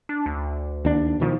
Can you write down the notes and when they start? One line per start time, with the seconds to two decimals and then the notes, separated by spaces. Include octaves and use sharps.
0.09 D4
0.26 D2
0.85 D#2 D4
1.20 B2 D#3 F3